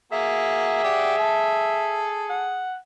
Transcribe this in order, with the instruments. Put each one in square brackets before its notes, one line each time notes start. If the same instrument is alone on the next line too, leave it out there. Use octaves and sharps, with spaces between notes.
[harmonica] A#3 F#4 [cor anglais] G#4 [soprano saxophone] E5
[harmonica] G4 D5 F#5
A4
[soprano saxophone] F#5